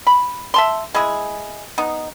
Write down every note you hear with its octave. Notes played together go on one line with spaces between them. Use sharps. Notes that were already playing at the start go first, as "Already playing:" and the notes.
B5
E5 A5 C6
G#3 E4 G#4
B3 D#4